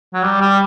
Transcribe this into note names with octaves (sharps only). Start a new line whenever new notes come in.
F#3
G3
G3